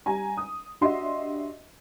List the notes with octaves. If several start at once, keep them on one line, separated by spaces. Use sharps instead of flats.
G3 G#5 A#5
D#6
D4 F#4 G4 D#5 E5 C6